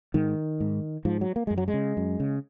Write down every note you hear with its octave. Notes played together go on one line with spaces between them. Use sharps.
G#2 D#3
G#2
G#2 F3
F#3
A#3
F#2 G#3
F#3
G#3
C#3
F#2
C#3